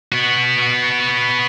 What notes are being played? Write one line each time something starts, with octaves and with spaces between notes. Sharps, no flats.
B3 F#4